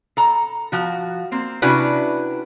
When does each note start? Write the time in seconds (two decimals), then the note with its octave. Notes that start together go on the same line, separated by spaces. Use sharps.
0.17 A4 A#5
0.72 F3 F#4
1.32 A#3 C4
1.62 C3 C#4 D4 E4 F#4 B4